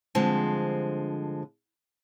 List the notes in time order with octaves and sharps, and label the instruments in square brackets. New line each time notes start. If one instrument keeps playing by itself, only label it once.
[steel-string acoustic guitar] G2 D3 F3 G#3 C4